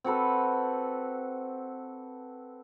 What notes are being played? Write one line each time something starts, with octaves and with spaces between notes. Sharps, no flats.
C4 F#4 A4 B4